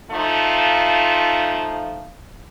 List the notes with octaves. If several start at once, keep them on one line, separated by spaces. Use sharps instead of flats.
F3 A3 D#4 F4